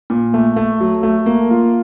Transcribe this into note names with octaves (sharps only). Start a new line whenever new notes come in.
A#2
A3
A3
F#3
A3
A#3
F4